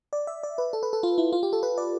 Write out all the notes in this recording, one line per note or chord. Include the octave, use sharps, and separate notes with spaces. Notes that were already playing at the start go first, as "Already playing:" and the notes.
D5
E5
D5
B4
A4
B4
A4
F4
E4
F4
G4
A4
B4
D5